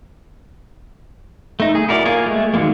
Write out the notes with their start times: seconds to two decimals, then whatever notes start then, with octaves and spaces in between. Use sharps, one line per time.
1.60 A3 D#4
1.75 G#4
1.88 E4 F#4 A#4 D5
2.05 A#3 F4 G#4 C#5
2.26 G#3 A3
2.54 D#3 F#3 G#3 A#3